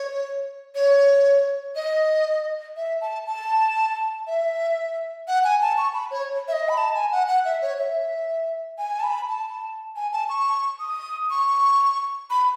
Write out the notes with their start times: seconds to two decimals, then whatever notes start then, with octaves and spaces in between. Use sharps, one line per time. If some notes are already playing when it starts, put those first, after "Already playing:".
Already playing: C#5
0.75 C#5
1.76 D#5
2.76 E5
3.01 A5
3.27 A5
4.27 E5
5.28 F#5
5.44 G#5
5.61 A5
5.78 C#6
5.94 B5
6.11 C#5
6.48 E5
6.53 D#5
6.69 B5
6.78 A5
6.95 G#5
7.12 F#5
7.28 F#5
7.45 E5
7.62 C#5
7.78 E5
8.78 G#5
8.99 A5
9.04 B5
9.29 A5
9.96 G#5
10.13 A5
10.29 C#6
10.80 D#6
11.30 C#6
12.30 B5